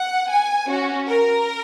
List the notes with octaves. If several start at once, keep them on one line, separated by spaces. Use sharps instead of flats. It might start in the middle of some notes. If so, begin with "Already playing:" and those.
Already playing: F#5
G#5
C#4 F#4
A#4